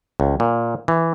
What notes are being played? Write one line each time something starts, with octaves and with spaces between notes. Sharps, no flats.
C#2
A#2
E3